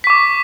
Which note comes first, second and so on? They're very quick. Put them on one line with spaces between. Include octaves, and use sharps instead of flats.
B6 C#6 D6